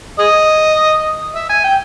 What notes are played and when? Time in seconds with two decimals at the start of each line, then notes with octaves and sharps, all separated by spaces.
0.19 G#4 D#5
1.35 E5
1.49 G#5
1.64 G5